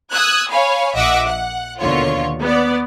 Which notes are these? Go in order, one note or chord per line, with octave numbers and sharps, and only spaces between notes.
D#6 E6 F#6 G#6
C#5 F5 G#5 B5
A#1 D#5 E5 F#5 D6 E6
F#5
D#2 B2 D3 F4 C#5
B3 D5